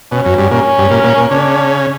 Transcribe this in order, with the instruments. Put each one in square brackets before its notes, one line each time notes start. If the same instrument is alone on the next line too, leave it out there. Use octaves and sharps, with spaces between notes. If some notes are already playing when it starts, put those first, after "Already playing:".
[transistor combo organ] B2 [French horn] C#4
[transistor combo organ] F#2
G2
[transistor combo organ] A#2 [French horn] C#4
[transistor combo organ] G2
A#2
A#2
A#2
[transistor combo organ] C#3 [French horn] D4